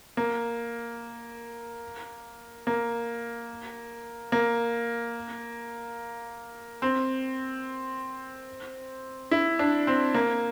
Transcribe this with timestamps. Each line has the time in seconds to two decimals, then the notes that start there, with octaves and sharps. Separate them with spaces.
0.17 A#3
2.67 A#3
4.32 A#3
6.82 C4
9.31 E4
9.59 D4
9.87 C4
10.14 A#3